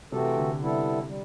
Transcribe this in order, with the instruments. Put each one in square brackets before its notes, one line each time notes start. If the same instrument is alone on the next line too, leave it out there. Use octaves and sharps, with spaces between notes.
[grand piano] C3 [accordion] E3 A3 C4 F#4 A4
[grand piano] D3
[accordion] C3 G3 B3 E4 A4
G3